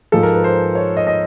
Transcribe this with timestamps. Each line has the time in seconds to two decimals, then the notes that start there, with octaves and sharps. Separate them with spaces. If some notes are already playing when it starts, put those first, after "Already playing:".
0.12 G#2 F3 G#3 A4
0.23 A#4
0.33 B4
0.44 C5
0.75 C#5
0.97 D#5
1.07 D#5